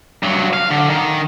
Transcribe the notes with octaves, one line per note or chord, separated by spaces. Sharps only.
G2 F#3
F5
D3
D#3